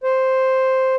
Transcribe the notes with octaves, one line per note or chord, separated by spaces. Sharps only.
C5